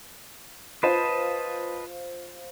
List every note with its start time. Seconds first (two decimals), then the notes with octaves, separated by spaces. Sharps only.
0.83 F4 B4 C5 D#5 A5